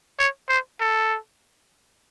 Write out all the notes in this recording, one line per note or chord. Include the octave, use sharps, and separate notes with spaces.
C#5
C5
A4